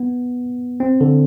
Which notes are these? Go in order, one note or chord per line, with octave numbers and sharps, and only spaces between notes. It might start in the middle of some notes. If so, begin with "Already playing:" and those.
Already playing: B3
C4
D3